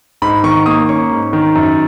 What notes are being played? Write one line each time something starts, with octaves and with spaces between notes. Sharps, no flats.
G#2 B5
D#3 C#6
A#3 D#6
C#4 C#6
G#2
D#3
F#2